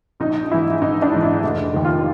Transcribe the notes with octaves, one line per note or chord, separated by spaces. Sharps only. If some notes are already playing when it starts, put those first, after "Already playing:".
A#1 D#4
G#2 E3 E4
A#1 D#4
D4
G#2 E3
E4
F1
D#2 D#3
F4